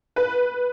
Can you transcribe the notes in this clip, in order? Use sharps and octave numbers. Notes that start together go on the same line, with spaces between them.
B4